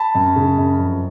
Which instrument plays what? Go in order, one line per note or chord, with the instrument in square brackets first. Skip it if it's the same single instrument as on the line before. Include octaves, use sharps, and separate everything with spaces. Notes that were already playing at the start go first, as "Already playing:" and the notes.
Already playing: [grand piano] A5 B5
F#2
C#3
F#2
F2